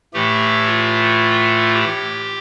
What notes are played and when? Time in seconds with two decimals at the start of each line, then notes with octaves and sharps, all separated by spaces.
0.13 A2 E3 A3 G4
0.67 F4
1.74 G4